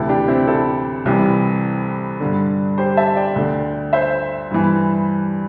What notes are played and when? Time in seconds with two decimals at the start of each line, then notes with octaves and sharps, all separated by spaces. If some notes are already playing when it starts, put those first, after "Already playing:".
Already playing: D2 C3 E3 E4 A4
0.09 D4 G4
0.28 C4 E4
0.47 E4 A4
1.05 C2 C3 E3
2.20 G2 D3
2.78 G4 C5
2.97 E5 A5
3.16 D5 G5
3.36 D2 D3
3.93 C5 E5
4.51 G2 E3